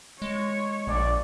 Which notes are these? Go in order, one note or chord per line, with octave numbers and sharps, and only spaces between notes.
G#3 C#5
A#1 D5